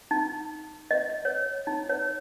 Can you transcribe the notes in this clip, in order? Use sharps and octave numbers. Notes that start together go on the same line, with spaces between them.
D#4
D#5
C#5
D#4
C#5